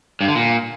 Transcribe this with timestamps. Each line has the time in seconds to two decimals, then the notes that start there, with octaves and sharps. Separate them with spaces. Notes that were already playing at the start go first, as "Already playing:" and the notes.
0.21 G2
0.28 D3
0.35 A#2